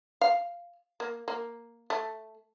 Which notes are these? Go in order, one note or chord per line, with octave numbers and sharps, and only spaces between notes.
F5
A#3
A#3
A3